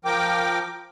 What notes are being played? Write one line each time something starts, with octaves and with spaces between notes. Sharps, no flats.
F3 A#4 G5 D6